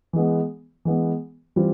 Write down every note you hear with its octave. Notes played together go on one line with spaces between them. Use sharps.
E3 G#3 B3
E3 G#3 B3
E3 G3 C4 F4